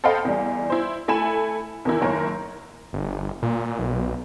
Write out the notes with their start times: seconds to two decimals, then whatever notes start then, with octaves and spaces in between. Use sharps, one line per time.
0.04 A4 C5 D#5 F5 G5 B5
0.25 E2 G3
0.70 E4 C5
1.08 A3 E4 A4 G#5 B5 E7
1.85 E2 D#3 E4
2.01 F#1 D#3 A#4 C#5
2.93 G1
3.42 A#2
3.79 B1